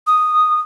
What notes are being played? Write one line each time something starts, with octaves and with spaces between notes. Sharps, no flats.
D#6